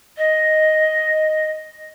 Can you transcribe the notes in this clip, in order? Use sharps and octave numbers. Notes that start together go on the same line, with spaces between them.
D#5